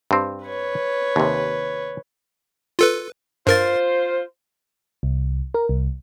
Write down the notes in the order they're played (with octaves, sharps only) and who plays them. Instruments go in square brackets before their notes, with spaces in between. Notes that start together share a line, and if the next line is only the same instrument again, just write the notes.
[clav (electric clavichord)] G2 C4
[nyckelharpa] B4 C#5
[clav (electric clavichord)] D#2 C3
[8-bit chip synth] F4 A4 B4
[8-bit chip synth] G2 A#4 A6 [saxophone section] F4 C5
[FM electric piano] C2
A#4
C2